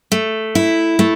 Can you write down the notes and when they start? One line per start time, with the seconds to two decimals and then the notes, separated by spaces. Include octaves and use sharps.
0.12 A3
0.55 E4
0.99 A3